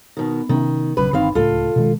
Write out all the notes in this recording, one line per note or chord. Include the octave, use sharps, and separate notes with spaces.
B2 D#3
C3 D#3 B3 C#4
A#1 F#2 C#3 B4
G1 D#3 C4 F5
D1 C#2 A2 F4 A4
B2 D#3 G#3